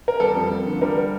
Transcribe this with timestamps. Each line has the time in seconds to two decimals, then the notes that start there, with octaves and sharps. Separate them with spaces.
0.08 A#4
0.20 G3 A4
0.35 F2
0.51 A#3
0.66 D3
0.81 G3 A#4